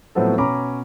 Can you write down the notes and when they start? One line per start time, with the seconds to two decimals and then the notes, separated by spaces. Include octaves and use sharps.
0.15 A2 F3 F#3 B3 C4 A4
0.38 B2 C#4 C#5 A#5 B5 D6